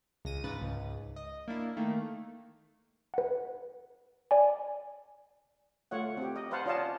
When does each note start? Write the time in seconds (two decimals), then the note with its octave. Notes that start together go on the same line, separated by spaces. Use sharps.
0.25 C#2 A#6 D#7
0.44 G#2 C#3 B4 A6
0.61 C#2 G#2
1.16 D#5
1.48 A#3 D4 E4
1.77 D#3 A3 A#3
3.14 B4 F#5
4.31 D5 G#5
5.91 A3 F4 C#5 F#5
6.17 C4 G4
6.36 D#5
6.51 B4 C5 F5 F#5 A5
6.66 C#4 F4 D5 D#5 F5 A5